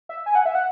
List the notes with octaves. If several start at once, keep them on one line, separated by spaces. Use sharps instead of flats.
E5
G#5
F#5
E5
F#5